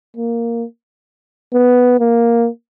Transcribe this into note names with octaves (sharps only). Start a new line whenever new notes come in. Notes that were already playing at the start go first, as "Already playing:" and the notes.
A#3
B3
A#3